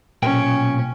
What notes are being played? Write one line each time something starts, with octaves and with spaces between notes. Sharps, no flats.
B1 A#2 C#4 G5